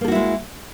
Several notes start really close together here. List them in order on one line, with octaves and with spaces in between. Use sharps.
A#3 A4 F#4 E4 G#3